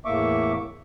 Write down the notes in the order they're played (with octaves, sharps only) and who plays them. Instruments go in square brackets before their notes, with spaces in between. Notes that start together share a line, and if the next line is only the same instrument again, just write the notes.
[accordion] E2 A2 A#3 E5 C#6 D6